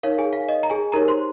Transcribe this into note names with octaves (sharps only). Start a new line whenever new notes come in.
D#4 A#4 C#5 F5
G#4 G#5
F5
D#5
A#5
G#4 G#5
D#4 G4 A#4 C#5 A#5
C5 C6